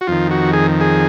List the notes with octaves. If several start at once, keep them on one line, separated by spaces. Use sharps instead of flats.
F#4
F2 D#3 F4
F#4
G#4
G#4